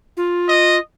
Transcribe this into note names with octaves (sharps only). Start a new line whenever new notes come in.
F4
D#5